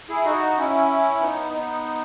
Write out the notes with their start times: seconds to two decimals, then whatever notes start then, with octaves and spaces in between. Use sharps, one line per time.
0.09 E4 G#4
0.25 D#4 F#4
0.58 C#4 E4
1.21 B3 D#4
1.53 B3 D#4